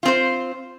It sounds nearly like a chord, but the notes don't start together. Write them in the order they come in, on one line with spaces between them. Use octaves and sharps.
F4 C4 C5